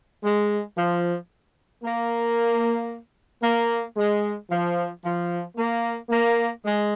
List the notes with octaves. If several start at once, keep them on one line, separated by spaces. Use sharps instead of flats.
G#3
F3
A#3
A#3
G#3
F3
F3
A#3
A#3
G#3